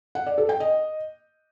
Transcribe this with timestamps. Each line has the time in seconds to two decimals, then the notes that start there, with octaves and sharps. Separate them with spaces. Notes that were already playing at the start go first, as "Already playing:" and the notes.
0.15 F#5
0.26 D5
0.38 A4
0.49 G5
0.60 D#5